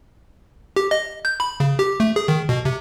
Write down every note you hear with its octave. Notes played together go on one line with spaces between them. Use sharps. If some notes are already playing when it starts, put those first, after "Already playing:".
G4
D#5
G6
B5
C#3
G4
A3
G#4
D#3
B2
C3